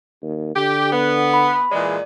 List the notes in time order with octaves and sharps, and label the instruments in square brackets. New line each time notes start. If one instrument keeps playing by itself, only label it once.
[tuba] D#2
[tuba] D3 [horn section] G4
[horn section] B3
[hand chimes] B5
[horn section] A#2 E3 G#3 [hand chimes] D5